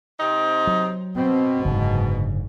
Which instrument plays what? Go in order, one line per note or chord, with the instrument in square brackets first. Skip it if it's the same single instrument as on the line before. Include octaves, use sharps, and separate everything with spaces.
[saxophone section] C3 C4 D#4
[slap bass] F#3
[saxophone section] B2 [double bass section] C4
[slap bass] F#1 D3 [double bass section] G#2